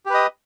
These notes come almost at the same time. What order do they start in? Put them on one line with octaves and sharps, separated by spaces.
G4 B4 D#5